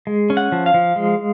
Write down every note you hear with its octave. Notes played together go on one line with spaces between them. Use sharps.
G#3
C#4
F#5
F3
F5
F3
G#3